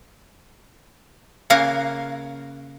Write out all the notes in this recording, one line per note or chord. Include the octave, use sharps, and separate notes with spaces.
C#3 A#3 A#4 F5 F#5 G#5